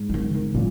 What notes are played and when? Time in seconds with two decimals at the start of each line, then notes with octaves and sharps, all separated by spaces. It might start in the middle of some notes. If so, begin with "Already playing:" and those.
Already playing: G#2
0.09 F#3
0.14 D#3
0.34 D#3
0.54 A#2 F#3